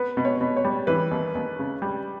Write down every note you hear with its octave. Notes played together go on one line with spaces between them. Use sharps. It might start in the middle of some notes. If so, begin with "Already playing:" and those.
Already playing: B3 B4
B2
C#5
B2
C#5
G3
E3 B4
D#2
D#2
C#3
G3